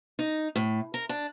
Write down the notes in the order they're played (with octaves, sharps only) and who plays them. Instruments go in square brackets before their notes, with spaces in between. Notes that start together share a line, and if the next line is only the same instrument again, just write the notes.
[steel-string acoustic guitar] D#4
A2
A#4
D4